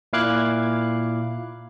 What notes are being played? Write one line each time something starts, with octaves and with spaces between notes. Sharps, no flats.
A#2 E4 F5 D6 F#6 G#6